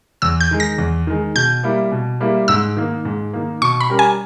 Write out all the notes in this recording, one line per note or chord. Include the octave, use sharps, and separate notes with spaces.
E2 E6
G6
D#3 G#3
A#6
E2
D#3 G#3
B2 G6
G3 A#3 E4
B2
G3 A#3 E4
G#2 E6
D#3 A#3
G#2
D#3 A#3
B2 C#6
B5
G3 C#4 G4 A#4
G#5